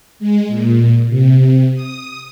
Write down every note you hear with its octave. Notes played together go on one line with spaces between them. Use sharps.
G#3
A#2
C3
D#6